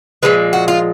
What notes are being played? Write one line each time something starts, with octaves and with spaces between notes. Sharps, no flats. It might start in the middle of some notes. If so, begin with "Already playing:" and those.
A#2 F3 G#3 B4
F#4
F4